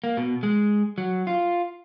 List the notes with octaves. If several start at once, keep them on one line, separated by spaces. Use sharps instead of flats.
A#3
B2
G#3
F#3
F4